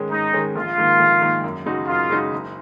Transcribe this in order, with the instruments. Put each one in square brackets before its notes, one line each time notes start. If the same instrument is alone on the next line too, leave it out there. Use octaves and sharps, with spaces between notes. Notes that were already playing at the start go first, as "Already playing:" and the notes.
Already playing: [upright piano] G#2 D#3 G#3 C#4 G#4
[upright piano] G#2 [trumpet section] D#4
[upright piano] D#3 G#3 C#4 G#4
[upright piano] A#1 [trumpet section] F4
[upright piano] G#2 D#3 A#3
A#1
G#2 D#3 A#3
F#2
C#3 G#3 D#4 F#4
[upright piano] F#2 [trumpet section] F4
[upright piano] C#3 G#3 D#4 F#4
F#1